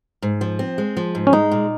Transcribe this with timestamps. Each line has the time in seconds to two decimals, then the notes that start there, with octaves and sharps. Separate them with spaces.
0.22 G#2
0.41 F3
0.59 C4
0.78 G#3
0.97 F3
1.15 G#2
1.27 C#4
1.33 G#3 D#4
1.51 A#2